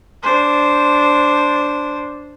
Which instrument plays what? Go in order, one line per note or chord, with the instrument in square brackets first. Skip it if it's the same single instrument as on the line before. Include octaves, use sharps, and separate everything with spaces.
[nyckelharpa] D4 C5